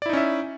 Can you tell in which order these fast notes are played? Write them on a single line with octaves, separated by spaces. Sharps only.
D5 E4 D#4 C#4 E5